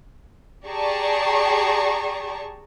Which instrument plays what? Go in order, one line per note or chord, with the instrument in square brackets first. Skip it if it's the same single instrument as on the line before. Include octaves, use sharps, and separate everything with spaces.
[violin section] G4 G#4 D5 A5 A#5 C#6